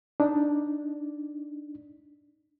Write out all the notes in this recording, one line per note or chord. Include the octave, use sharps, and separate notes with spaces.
D4 D#4